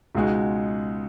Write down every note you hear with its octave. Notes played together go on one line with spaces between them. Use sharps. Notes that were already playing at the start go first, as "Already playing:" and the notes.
C#2 B2 G#3 D#4 F#4